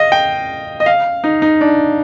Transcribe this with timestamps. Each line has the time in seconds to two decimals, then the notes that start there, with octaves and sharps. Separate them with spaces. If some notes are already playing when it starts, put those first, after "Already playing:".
Already playing: D#5 F5
0.12 G5
0.80 D#5
0.86 F5
1.24 D#4
1.42 D#4
1.61 D4